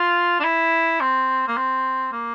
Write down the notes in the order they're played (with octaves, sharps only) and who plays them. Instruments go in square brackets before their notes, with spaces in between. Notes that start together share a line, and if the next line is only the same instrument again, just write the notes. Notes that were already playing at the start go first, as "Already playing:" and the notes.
Already playing: [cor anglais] F4
D4
E4
C4
A#3
C4
A#3